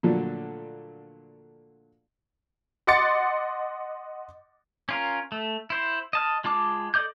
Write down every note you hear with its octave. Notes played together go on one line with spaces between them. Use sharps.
A#2 D3 F3 F#3 A3 D4
D#5 F#5 C6 D6 A6 C#7
C#4 F4 A#4
A3
E4 C5
D#5 A5 F6
G#3 F4 A5 D6
A4 D5 D#5 D6 G6